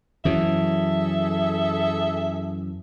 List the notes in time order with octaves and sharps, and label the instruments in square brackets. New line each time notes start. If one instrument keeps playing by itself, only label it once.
[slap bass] F#2 E3 F#3 [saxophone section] G#4 A4 E5